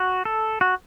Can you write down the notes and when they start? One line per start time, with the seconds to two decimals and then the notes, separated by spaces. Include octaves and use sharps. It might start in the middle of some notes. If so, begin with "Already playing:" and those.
Already playing: F#4
0.25 A4
0.61 F#4